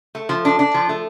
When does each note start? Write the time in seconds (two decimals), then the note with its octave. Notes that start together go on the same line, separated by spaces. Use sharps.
0.15 A3
0.29 F3
0.45 D4
0.59 D4
0.74 F3
0.89 A3